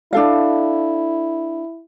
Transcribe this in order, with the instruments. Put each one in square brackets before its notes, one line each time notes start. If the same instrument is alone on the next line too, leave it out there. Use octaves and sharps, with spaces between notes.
[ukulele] D4 A4 F5 [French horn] E4